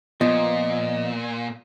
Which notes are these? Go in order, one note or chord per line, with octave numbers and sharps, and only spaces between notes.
A#2 F3 B3 D#5